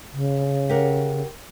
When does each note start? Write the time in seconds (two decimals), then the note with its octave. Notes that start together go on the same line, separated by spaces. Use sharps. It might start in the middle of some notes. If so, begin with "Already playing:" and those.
0.13 C#3
0.69 G4 A#4 F#5